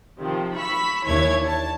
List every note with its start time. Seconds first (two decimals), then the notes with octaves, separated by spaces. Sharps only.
0.19 C3 D#3 F3
0.55 B5 C#6 E6 B6
1.05 D#2 E3 D4 E4 C#5 G#6
1.46 A5